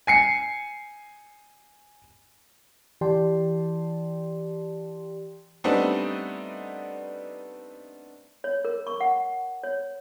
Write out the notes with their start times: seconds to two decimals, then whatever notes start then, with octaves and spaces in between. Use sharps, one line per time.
0.07 G#5 C7 C#7
3.01 E3 G4 D5 G5 A5 C6
5.64 G3 A3 B3 C4 D4 D#4
8.44 C#5
8.65 A#4
8.87 C#6
9.01 F#5
9.63 C#5